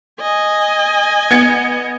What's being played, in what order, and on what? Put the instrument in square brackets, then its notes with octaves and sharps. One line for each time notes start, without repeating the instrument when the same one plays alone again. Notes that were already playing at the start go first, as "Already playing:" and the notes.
[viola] D#5 G#5
[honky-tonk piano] B3 G#6 C#7